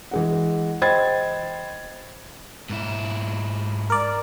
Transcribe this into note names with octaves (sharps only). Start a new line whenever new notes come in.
E3 G#3 F#5
C5 D#5 G5 B5 G#6 A6
G#2 E4
A#4 D5